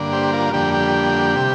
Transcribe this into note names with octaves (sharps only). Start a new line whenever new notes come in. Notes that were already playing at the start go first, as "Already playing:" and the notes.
Already playing: G2 D3 A#3 D4
G4 C5
F4 A#4
F2 D3 G3 A#3 D4 G4
G4
C3 G3